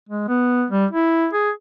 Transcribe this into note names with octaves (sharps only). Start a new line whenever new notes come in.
G#3
B3
G3
E4
G#4